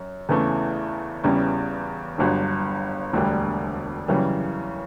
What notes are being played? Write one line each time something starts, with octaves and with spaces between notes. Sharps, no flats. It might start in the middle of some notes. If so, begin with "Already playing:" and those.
Already playing: F#2
E2 C#3 E3 A3
E2 C#3 E3 G3 C#4
G1 G2 D3 F#3
E1 D2 D3 G3 D4
F#2 C#3 E3 G3